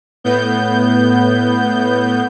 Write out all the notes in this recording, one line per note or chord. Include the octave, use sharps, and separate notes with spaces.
A2 B3 G6